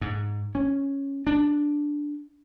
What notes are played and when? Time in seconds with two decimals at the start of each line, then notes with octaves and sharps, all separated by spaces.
0.01 G#2
0.55 C#4
1.27 D4